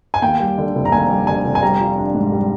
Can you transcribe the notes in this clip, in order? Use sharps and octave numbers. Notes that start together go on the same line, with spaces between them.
G#5
D#2 G5
G3
D3
F1
A#5
D#2 G#5
G3
D3 G#5
F1
G#5
G3 A#5
F4
D4
G#2
G3